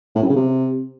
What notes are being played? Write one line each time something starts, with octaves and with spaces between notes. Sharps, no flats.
A2
F#2
C#3
C3